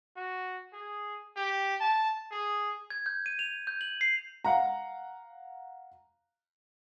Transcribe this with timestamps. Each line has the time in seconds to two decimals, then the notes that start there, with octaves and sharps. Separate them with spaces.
0.16 F#4
0.73 G#4
1.36 G4
1.80 A5
2.31 G#4
2.90 G#6
3.06 G6
3.26 D#7
3.39 F7
3.67 G6
3.81 F#7
4.01 C7
4.45 F5 F#5 A#5